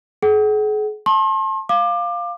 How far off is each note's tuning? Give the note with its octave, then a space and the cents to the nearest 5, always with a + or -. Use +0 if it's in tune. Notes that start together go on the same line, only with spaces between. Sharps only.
G#4 +35 F#5 +35
A5 +0 C6 +40
F5 +0 D6 +25